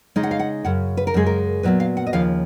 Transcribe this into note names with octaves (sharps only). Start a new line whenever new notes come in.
C#3 G#3 D#4
F#5
F5
F#5
F#2 C#3 F#5
B4
A#4
F#2 C#3 G#3 G#4
A#4
A#2 F#3 B3 B4
F5
F#5
D#5
D#2 C#3 F3 F5